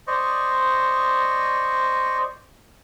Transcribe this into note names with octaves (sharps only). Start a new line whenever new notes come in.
C5 D5 D#5 C#6